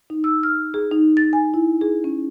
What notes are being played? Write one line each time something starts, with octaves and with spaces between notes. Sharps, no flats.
D#4
E6
F6
G#4
D#4
A6
G#5
E4
G#4
C#4